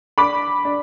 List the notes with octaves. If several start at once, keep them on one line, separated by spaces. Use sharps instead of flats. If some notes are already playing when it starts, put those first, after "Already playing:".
D4 B5 D6
D4